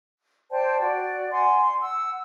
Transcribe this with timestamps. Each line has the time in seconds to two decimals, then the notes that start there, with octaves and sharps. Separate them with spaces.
0.51 C5 D5 G5 A5
0.79 F#4 D5
1.31 F#5 G#5 C6
1.61 C6
1.82 F#5 E6